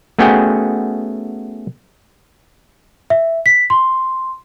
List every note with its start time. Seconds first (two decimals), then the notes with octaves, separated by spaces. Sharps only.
0.19 A3 B3 C#4 F#4 G#4 G5
3.10 E5
3.46 B6
3.70 C6